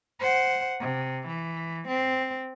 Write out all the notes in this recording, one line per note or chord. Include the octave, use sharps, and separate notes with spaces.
C5 F#5
C3
E3
C4